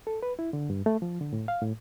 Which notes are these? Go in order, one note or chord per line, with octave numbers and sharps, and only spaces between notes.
A4
B4
E4
D3
G2
A3
F3
D3
A2
F5
A2